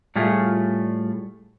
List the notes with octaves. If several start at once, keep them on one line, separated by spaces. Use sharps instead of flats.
A2 G3 A3 F4 G#4